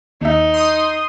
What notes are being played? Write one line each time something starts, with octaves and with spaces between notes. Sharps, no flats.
D#2 D#4 E5
C6 D#6